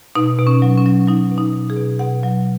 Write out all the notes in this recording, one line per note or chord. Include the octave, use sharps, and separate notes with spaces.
B2 D#4
B2
C#4
F#3
C#4
F#3
F#3 D#4
B2
D#4
B2
G#4
B2
B2 F#5
F#3